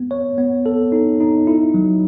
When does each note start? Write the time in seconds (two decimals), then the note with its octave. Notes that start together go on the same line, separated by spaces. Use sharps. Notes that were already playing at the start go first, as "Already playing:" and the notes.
Already playing: B3
0.11 C#5
0.38 B3
0.66 A4
0.92 D#4
1.20 D#4
1.47 E4
1.74 F#3